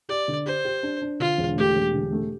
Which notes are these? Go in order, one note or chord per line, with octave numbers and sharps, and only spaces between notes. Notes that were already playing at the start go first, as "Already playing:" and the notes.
G4 D5
D3
G4 C5
G4
D4
D4
D3 F4
E1
A3 G4
E1
D3
A3